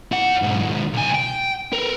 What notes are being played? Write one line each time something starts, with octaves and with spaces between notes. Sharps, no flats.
E4 F#5
B1 G#2
D#2 G#2
B1 G#5
G5
A#4 B4